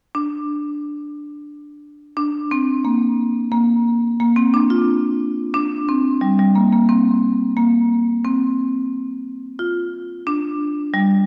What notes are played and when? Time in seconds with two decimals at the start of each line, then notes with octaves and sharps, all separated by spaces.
0.15 D4
2.17 D4
2.51 C4
2.85 A#3
3.52 A#3
4.20 A#3
4.36 C4
4.54 D4
4.70 F4
5.54 D4
5.89 C4
6.21 G3
6.39 G3
6.55 A#3
6.73 A#3
6.89 C4
7.57 A#3
8.25 C4
9.59 F4
10.27 D4
10.94 G3